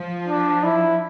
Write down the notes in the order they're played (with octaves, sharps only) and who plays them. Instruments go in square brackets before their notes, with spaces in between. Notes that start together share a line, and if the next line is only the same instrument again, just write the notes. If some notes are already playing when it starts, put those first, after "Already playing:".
Already playing: [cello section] F3
[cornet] D4
E4